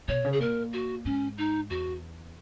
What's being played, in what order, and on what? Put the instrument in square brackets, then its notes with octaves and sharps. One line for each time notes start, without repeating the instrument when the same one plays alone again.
[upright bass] B2 [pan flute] C#5
[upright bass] C#3
[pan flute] G#4
[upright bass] A#2 [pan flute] A#4
[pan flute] F#4
[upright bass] G#2 [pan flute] C#4
[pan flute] D#4
[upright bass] E2 [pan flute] F#4